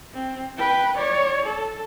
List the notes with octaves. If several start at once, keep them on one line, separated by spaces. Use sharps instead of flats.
C4
B4 G5
C#5 D5
A4